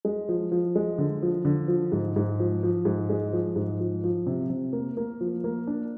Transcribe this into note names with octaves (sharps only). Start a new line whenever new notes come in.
G#3
F3
F3
G#3
D3
F3
D3
F3
G#2
G#2
F3
F3
G#2
G#3
F3
G#2
F3
F3
C3
C3
A#3
A#3
F3
A#3
D4